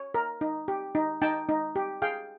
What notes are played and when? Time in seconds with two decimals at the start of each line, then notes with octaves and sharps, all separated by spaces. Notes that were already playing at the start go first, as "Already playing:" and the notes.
Already playing: C#5
0.14 A#4
0.41 D#4
0.68 G4
0.95 D#4
1.22 D#4 G5 A5
1.49 D#4
1.76 G4
2.02 G#4 F5 G5